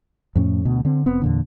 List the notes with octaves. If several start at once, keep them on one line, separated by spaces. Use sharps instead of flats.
F2 A2 C#4
D2 B2
D3 C4
F1 B3 C4
E2 A#2 D3